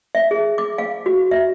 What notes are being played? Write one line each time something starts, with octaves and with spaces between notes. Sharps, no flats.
E5
G#4
D6
F5
F#4
E5